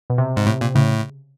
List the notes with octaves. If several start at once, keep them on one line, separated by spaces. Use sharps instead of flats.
B2
C3
G#2
A2
A#2
A2 C#3